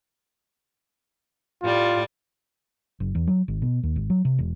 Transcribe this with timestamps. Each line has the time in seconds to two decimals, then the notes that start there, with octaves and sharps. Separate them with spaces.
1.62 A2 G3 F4 D5
3.00 F#1
3.15 E2
3.27 F#3
3.48 G#1
3.62 B2
3.83 D#2
3.96 G#1
4.10 F#3
4.25 C3
4.39 E1